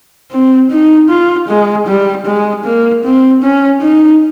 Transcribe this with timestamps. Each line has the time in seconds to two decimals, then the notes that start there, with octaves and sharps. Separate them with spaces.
0.32 C4
0.71 D#4
1.09 F4
1.48 G#3
1.87 G3
2.26 G#3
2.65 A#3
3.04 C4
3.43 C#4
3.81 D#4